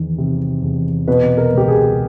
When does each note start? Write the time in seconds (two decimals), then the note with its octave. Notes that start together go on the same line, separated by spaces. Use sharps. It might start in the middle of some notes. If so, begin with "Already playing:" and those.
Already playing: E2 D#3
0.18 C3
0.63 E2
1.08 B2 B4
1.38 A#4
1.53 C#2 G4
1.68 G#4